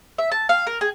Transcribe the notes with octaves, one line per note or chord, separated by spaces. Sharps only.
E5
A5
F5
A#4
G#4